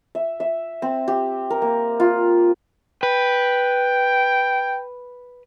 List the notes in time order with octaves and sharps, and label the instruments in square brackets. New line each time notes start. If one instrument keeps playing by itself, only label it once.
[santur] E5
E5
C4
G4
A#4
A#3
F4
[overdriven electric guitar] B4 [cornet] G5